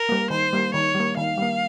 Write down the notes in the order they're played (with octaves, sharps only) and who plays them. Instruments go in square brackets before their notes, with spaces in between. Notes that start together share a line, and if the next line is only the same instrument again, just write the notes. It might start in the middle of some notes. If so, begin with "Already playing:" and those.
Already playing: [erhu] A#4
[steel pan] G3 A#3
[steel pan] D#3 [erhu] C5
[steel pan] G3 A#3
[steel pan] D#3 [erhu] C#5
[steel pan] G3
A#3
[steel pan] D#3 [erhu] F5
[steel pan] G3 A#3